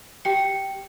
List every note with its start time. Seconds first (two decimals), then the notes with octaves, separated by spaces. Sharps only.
0.25 G4 G5 C#7